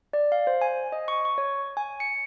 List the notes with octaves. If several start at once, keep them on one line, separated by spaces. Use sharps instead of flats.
D5
F5
C5
G#5
D#5
C#6
C#6
C#5
G#5
C#7